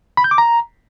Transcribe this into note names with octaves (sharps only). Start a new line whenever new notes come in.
B5
G6
D6
A#5